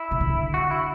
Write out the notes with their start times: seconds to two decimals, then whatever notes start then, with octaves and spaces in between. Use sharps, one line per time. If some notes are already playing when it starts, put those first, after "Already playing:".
Already playing: E4
0.11 C3
0.20 D3
0.54 F#4
0.71 E4